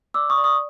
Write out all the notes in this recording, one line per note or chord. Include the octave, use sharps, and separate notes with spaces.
D5 D6 E6
C#6 D#6
D5
C#6 D#6